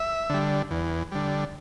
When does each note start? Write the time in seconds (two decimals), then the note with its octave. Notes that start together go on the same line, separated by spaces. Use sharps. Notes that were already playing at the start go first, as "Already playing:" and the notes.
Already playing: E5
0.30 D3 G3
0.71 E2
1.12 D3 G3